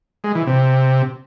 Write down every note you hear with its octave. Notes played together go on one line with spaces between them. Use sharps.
G#3
E3
C3